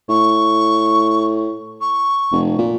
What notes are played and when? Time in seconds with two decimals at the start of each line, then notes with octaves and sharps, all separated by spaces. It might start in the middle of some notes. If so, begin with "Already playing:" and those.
0.09 A2 C#6
1.81 C#6
2.32 F1
2.58 A#2